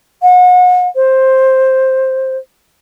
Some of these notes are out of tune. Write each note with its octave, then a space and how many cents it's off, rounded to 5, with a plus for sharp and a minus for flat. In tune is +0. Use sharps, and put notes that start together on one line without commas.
F#5 -35
C5 +10